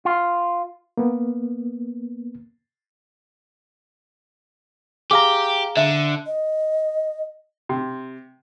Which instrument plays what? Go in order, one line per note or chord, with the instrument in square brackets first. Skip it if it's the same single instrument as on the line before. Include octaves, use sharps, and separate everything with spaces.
[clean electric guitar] F4
[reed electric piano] A#3 B3
[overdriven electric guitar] G4 [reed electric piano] G#4 F5 A#5 [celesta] D6
[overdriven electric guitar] D3 [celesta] E5
[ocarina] D#5
[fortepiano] C3